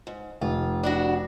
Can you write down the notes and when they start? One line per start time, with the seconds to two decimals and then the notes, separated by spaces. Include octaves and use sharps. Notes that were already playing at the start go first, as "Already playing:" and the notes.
0.07 G#2
0.41 F1 F4
0.83 D4 E4 F#4